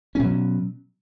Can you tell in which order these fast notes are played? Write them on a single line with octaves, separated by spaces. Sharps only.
C#4 B2 F#3